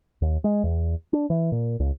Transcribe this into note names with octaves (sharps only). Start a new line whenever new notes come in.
D#2
G#3
E2
D4
E3
A#2
C#2